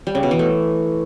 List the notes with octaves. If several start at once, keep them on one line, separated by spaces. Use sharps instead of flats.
G3
C#3
B2
E3
A3